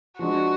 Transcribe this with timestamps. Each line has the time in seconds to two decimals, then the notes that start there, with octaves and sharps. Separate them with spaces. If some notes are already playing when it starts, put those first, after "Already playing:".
0.19 F3 G#3 D4 F#4